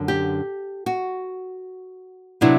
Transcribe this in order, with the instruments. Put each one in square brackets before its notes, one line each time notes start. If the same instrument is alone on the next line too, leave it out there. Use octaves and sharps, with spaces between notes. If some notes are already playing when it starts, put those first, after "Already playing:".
Already playing: [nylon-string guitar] F#2 D3
G4
F#4
C3 F#3 B3 D4 E4